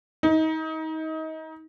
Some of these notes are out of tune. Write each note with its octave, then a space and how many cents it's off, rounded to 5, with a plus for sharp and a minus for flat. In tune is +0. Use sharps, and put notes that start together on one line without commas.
D#4 +30